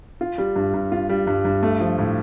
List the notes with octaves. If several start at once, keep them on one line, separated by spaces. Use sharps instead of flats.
F4
G3
G2
G2
F4
G3
G2
G2
A3
F3
A2